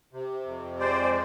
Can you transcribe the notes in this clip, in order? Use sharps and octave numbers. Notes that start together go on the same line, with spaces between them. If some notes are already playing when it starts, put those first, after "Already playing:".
C3
F2
G#3 C5 D5